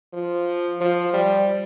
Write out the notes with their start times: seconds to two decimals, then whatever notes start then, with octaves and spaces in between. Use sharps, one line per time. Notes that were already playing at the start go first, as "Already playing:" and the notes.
0.13 F3
0.81 F3
1.13 G3